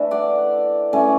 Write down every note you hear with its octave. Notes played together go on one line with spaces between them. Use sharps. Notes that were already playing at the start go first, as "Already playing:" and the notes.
Already playing: E3 A3 D4 E5
D5 F#5
E3 A3 C#4